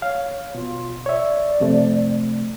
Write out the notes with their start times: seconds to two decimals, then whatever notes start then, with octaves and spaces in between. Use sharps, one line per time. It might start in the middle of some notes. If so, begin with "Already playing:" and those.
0.02 C#5 F5
0.55 B2 F4
1.06 C#5 D5 E5
1.60 F2 C3 A3